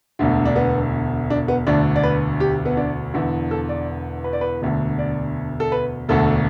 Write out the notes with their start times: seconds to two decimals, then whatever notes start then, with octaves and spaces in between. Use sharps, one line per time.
0.19 E1 D2 D3
0.45 D4
0.56 B3
1.30 D4
1.48 B3
1.67 E1 D2 D3 D4
1.96 D5
2.03 B4
2.40 G4
2.65 B3
2.77 D4
3.14 E1 E2 D3 E4
3.51 A4
3.69 D5
4.24 B4
4.33 D5
4.41 B4
4.62 E1 D2 D3
4.99 D5
5.60 A4
5.72 B4
6.09 E1 D2 D3 A4